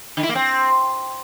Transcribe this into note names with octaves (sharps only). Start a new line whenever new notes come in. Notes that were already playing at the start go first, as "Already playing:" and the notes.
D3
E4
A#3
C4